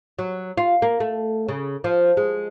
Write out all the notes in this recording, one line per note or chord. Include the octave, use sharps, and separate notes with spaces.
F#3
F4
A#3
A3
C#3
F3
G#3